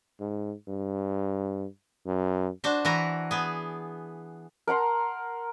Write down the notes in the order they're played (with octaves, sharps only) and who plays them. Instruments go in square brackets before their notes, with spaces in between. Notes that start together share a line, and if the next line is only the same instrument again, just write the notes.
[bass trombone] G#2
G2
F#2
[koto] D4 F#4 C5
E3 E4 F#4 A#5
B3 G#4
[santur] A#4 F#5 A#5 C6